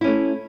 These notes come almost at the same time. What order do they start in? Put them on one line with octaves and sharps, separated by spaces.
E4 C#4 A3